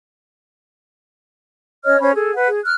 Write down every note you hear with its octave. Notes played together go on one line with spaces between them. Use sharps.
C#4 C#5 D#5 F6
C#4 C5 C#5 B5
G#4 A4
B4 F#5
G#4
F6 F#6